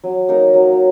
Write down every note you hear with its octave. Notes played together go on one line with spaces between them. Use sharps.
F#3
A#3 D#4 A#4
F#3